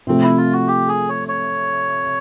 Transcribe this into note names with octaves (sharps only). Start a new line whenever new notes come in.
C3 F3 A3 C4
E4
F4
F#4
G4
G#4
C#5
C#5